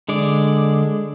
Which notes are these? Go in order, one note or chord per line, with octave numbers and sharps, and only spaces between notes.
D3 G#3 D5